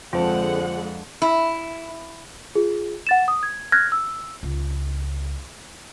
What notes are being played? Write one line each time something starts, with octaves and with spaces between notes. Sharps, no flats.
F2 D3 G#3 F4 C5 F#5 A5
E4
F4 G#4
F#5 A6 E7
D#6
G#6
F6 F#6 G#6 A#6
E6
C#2